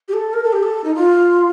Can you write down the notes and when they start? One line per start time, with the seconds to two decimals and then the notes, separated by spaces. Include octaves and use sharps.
0.08 G4
0.13 A4
0.34 A#4
0.44 A4
0.53 G4
0.63 A4
0.84 D#4
0.95 F4